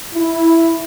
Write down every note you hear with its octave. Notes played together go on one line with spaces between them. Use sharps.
E4